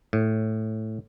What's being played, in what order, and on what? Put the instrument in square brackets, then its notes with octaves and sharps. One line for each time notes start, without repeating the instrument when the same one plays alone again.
[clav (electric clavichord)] A2